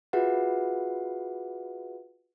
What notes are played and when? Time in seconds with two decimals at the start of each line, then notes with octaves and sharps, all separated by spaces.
0.13 F4 F#4 G#4 B4 E5 F#5